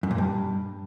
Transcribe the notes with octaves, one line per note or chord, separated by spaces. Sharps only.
F#2
A#2
G2